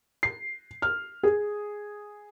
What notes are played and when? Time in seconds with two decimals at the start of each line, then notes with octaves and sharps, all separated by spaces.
0.23 C7
0.82 F6
1.23 G#4